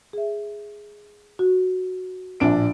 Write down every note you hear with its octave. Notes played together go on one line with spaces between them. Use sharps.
G#4 E5
F#4
A#1 A2 D4 E5 F#5 D7